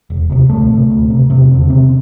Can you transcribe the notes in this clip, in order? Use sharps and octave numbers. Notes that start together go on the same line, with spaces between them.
E1
D2 C3
D2 A2 A3
C3
D2
C3
E1 C3 C4
E2 D3
E1 C3 C4